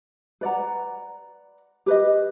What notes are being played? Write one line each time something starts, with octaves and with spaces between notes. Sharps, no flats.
B4 D5 F#5 A#5
G4 B4 D#5